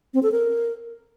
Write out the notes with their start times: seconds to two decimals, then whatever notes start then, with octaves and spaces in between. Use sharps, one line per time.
0.14 C4
0.23 A4
0.32 A#4